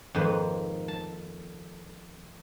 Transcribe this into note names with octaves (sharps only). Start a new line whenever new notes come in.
F2 G#2 D#3 A#3 B4
A5